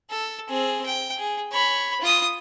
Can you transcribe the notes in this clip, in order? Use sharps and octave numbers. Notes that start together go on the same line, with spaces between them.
A4
C4 G#4
G5
G#4
C#5 B5
F4 D#6